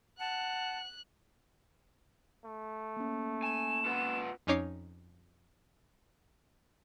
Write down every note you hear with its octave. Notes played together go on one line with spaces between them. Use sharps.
F#5 A5 F#6
A3
A#3 C#4
G#5 E7
F4 B4 F#5
F2 C#4 D#4 C#5 D6 C7